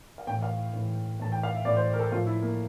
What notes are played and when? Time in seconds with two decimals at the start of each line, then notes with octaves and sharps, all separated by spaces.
0.18 F5
0.27 A2 G5
0.31 E3
0.43 F5
0.73 A2 E3
1.20 A2 E3 A5
1.32 G5
1.43 F5
1.55 E5
1.65 A2 D5
1.69 E3
1.77 C5
1.93 A#4
2.00 A4
2.12 A2 F3 F4
2.26 E4
2.42 A#3